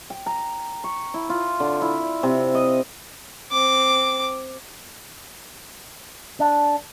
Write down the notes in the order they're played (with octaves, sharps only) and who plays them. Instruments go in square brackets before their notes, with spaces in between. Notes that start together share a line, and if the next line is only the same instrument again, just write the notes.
[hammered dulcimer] G5
A#5
C#6
E4
F4
D3
E4
C3
D#5
[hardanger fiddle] C4 D6
[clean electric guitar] D4